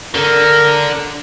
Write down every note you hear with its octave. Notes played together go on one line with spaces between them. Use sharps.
D3 A#4